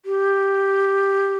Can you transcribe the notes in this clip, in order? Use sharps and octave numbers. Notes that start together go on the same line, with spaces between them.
G4